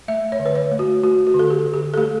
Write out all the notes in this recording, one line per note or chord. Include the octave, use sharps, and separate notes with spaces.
A3 E5
C#5
D3
B4
C#5
A3
F#4
A3 F#4
F#4
D3
A4
G4
D3
G4
A4
A3 G4